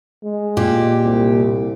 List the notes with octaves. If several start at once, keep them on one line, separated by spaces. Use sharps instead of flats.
G#3
A#2 G4
C2